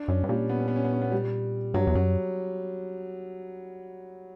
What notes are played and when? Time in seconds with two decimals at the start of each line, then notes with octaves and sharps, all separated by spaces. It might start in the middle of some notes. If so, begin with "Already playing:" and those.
Already playing: D4
0.08 F#2 C#4
0.23 G2
0.29 A#2 G3
0.49 B3
0.59 C#4
0.68 B3
0.76 C#4
0.84 B3
0.93 C#4
1.02 B3
1.12 G3
1.74 G2 F#3
1.87 E2
1.95 F#2 F#3